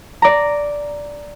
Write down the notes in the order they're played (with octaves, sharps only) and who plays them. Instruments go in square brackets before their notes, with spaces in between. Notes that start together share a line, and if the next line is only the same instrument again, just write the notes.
[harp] D5 A#5